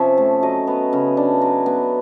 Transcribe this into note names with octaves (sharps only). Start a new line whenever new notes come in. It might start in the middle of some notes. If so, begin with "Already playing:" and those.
Already playing: C3 F3 C#4 E5
A3
F#3 D#5
B3
C#3
D4
F#3
B3